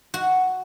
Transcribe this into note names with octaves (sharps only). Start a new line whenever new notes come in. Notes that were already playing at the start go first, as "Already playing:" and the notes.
F#4